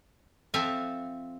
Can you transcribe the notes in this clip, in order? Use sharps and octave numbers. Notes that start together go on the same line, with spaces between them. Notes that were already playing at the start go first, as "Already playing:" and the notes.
F3 C4 A4 E5 F5 G#5